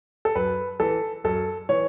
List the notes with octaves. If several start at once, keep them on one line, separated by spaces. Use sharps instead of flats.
A4
F#2 B4
E3 A4
F#2 A4
E3 C#5